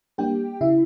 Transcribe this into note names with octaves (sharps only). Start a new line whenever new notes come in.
G3 A#3 D4 G4 G5
C#3 E4 E5